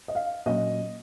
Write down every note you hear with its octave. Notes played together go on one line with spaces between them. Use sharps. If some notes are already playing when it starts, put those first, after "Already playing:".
D#5
F5
A#2 F#3 C#4 D#5